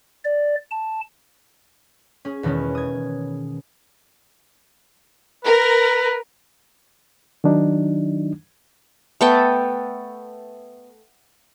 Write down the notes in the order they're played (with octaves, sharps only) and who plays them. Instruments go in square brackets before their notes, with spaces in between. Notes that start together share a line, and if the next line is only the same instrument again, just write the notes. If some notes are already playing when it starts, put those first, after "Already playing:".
[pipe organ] D5
A5
[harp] C#4 G#4
E2 B2 D#3 G#3 B3 C#4
D#6 G#6
[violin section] A#4 [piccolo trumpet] B4
[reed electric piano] D#3 F#3 D4 D#4
[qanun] A3 B3 A4 G5